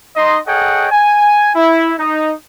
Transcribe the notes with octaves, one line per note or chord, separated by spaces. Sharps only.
D#4 D#5 C6
G#4 A4 C#5 D#5 F#5 G5
G#5
E4
D#4